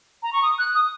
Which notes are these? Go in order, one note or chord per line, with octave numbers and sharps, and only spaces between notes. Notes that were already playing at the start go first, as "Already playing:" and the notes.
A#5
C#6
D#6
F#6
D#6